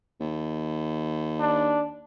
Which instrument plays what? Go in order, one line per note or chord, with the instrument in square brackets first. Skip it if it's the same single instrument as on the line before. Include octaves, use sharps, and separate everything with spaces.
[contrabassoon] D#2
[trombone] D4